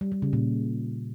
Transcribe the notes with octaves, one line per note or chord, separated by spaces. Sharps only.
G3
G3
C#3
A#2